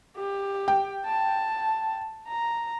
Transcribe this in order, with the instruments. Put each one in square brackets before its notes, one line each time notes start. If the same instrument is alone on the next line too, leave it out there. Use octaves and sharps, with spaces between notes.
[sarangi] G4
[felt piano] G5
[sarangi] A5
A#5